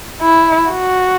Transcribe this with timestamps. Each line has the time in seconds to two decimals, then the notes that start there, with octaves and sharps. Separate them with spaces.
0.22 E4
0.71 F#4